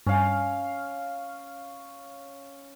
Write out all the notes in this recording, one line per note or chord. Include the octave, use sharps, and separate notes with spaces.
G2 C#4 F5